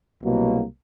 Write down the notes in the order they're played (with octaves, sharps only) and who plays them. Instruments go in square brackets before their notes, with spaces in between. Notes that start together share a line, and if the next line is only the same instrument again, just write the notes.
[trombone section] C2 B2 F#3 A#3